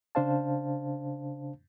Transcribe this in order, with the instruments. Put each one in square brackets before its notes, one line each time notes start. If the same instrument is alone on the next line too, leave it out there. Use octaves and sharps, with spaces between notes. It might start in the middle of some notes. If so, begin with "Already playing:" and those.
[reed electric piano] C#3 D4 C5 F5 A5